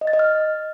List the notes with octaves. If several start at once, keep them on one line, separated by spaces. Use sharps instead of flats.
D#5
A6
D#5
F6